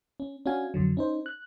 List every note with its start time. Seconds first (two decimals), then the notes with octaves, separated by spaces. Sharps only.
0.20 C#4
0.46 C#4 D4 F#4 F5 G#5
0.74 F2 D3 F#3
0.97 C#4 D#4 C5
1.26 F#6